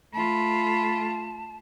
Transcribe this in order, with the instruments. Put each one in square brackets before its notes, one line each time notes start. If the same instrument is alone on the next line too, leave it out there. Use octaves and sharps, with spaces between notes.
[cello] A3 F4 [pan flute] A5 [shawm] B5